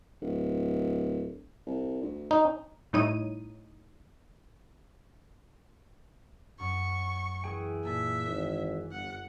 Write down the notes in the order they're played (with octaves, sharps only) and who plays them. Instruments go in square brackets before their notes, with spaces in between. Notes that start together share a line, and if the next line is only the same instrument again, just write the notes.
[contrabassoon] D1
C2
D2
[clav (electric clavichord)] D#4
[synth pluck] A2 G3 D#4 E4 C#5 D#7
[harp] F#2 [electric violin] C#6
[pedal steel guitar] E3 G#4 G5
[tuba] A#2 [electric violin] E5 [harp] A5
[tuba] G#1
[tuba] G1 [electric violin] F#5